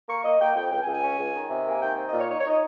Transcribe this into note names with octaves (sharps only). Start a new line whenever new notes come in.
A#3 C#6
A#3 D#5
A#3 G5
F2 G5
C#2 G5
G#5
C#2
G#5
C#4
C#2
D#3
C3
A#3 G#5
D#3 G5
C4
D#5
A#2
C#5
D#4 C#5
C#5
D#4 D#5